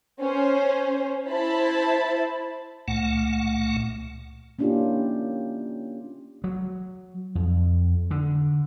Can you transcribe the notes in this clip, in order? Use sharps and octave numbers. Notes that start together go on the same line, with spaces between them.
C#4 C5
E4 C5 A5 B5
C#2 A#2 A3 F#5
A#3 C#4 D4 E4 F4 G4
F#3
F2
D3